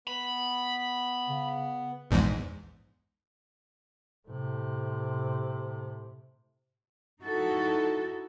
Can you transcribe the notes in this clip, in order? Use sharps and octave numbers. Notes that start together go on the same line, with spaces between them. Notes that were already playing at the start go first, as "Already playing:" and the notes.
B3 B5
C#3
A#1 E2 G#2
A2 C3
D#4 E4 F#4 A4